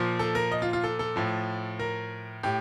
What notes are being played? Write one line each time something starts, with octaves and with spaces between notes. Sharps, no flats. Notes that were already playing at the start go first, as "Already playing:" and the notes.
Already playing: A#2 F3
A4
A#4
D#5
F4
F4
A4
A4
A2 F3
A#4
A2 G4